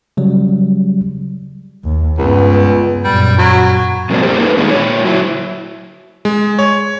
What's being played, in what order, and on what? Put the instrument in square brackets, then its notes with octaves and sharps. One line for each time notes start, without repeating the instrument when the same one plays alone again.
[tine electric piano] C#3 F#3 G3
[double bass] D#2
[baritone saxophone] C#2 [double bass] G2 B3
[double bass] F#2 A#2 [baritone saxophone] G3
[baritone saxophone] F#3
[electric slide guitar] C3 F#3 G#3 A#3 C4 D4
G4 A#4 C5
A#3 D#4 F#4 G#4 A4 B4
B2 D3 D#3 G3 G#3 A#3
A#2 C#5
F#3 E4
[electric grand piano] G#3
C#5